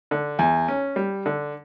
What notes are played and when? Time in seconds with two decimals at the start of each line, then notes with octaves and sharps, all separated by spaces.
0.11 D3
0.39 E2
0.68 C#4
0.96 G3
1.26 D3